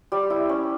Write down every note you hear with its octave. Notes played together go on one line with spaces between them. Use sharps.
G3
E4
C#4